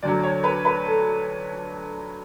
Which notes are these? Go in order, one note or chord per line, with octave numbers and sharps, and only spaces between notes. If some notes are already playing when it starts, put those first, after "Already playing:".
D2 D3 F#3 D5
C#5
B4
B4
A4